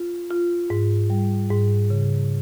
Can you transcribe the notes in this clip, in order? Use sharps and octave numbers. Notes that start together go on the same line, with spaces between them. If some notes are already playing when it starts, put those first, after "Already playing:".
Already playing: F4
F4
G#2
G3
G#2
C#3